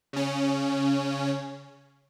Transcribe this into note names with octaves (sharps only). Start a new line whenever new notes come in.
C#3 C#4